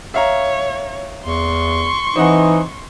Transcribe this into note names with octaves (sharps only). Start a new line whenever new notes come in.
C#5 E5 F5 A#5
E2 C6 C#6
E3 C4 D#4 D#5 F#5